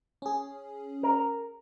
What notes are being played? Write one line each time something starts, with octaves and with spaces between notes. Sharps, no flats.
C#4 G#4
A#4